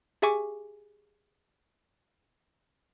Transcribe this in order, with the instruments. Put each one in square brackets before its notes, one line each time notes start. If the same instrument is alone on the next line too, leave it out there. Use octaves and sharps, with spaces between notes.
[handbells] G4 G#4 E5 G#5 C#6 D6